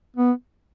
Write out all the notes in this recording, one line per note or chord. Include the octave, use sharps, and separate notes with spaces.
B3